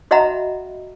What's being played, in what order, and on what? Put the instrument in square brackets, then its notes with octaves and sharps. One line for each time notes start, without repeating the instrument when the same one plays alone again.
[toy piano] F#4 D#5 E5 F#5 A#5 B5